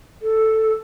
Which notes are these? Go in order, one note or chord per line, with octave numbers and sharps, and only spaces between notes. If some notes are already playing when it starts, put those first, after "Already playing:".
A4